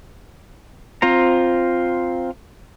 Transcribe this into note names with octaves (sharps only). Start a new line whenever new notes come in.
C4 F4 C5 A#5